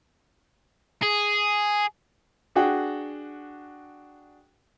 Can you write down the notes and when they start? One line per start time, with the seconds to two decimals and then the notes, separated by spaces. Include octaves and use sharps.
1.03 G#4
2.56 D4 F#4 G#4 F#5 G5